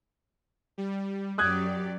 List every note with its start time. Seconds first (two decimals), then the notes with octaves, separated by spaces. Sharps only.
0.78 G3
1.38 F#2 F#3 G4 D5 D#6 F#6 G#6